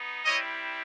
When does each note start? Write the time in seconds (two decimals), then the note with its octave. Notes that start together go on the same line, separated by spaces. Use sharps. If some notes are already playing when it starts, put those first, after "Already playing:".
Already playing: B3 D#4
0.25 G3 C4 E4 C#5 D#5